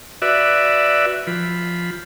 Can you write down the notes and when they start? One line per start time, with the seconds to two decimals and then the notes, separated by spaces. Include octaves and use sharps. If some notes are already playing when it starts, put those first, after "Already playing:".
0.22 F#4 B4 D5 E5
1.27 F3 B5